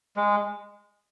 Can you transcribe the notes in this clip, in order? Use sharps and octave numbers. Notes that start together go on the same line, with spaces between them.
G#3